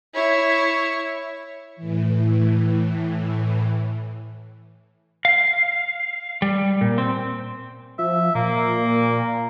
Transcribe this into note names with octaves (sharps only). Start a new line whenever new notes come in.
E4 C#5
A2 E3
F5
G3
A#2
C4
F3 E5
A#2 A#3